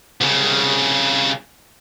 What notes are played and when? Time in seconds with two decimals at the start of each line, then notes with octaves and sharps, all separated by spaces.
0.21 C2 C#3